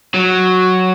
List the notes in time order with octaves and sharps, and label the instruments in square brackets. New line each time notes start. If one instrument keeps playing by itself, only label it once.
[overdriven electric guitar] F#3